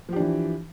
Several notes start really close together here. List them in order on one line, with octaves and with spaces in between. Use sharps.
F3 G4 D4 E3